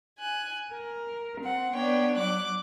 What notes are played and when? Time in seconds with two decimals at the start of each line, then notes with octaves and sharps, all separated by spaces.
0.19 G#5 F#6
0.74 A#4
1.42 C4 F#5
1.74 B3 D4 C#5 G5
2.17 F#3 D6 F#6